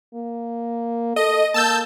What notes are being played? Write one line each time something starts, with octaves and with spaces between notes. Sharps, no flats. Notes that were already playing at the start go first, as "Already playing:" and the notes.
A#3
A4 D#5
A#3 A5 E6 G6